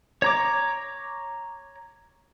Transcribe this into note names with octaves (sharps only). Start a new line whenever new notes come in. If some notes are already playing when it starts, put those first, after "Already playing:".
C#5 A#5 D6